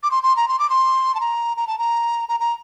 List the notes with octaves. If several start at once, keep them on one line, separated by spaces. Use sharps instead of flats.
D6
C6
C6
A#5
C6
D6
C6
A5
A#5
A#5
A5
A#5
A#5
A#5